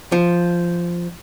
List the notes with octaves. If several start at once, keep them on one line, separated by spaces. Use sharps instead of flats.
F3